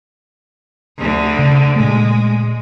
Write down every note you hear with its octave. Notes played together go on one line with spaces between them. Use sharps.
D2 D3
C#3
A#2 G#3 A3